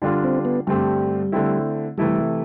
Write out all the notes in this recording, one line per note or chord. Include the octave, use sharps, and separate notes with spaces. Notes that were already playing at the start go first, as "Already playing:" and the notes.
D3 G3 D4 F4
C4
B3
G2 D3 G3 A3 C4 G4
D3 A3 C4 E4
C3 E3 G3 A3 E4 A4